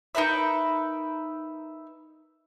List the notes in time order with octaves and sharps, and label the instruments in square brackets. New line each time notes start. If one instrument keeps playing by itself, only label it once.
[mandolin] D#4 A#4 B4 E5